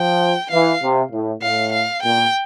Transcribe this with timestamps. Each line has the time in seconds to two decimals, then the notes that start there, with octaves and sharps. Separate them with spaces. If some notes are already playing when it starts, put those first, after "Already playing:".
Already playing: F3 G5
0.51 E3 F5
0.81 C3
1.12 A2
1.42 A2 F5
1.73 F5
2.03 A#2 G5